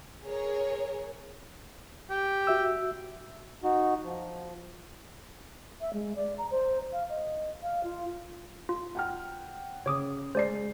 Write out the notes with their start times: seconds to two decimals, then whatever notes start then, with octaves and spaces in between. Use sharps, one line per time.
0.25 G#4 A#4 C#5
2.10 G4
2.47 F#4 E5 E6
3.63 D#4 F#4
4.04 F3
5.81 E5
5.93 G#3
6.16 D5
6.38 A#5
6.51 C5
6.93 F5
7.09 D#5
7.62 F5
7.83 F4
8.69 F4
8.95 F#5 G5 F6
9.86 C#3 C#5 D6 D#6
10.35 G#3 C5 D5 C7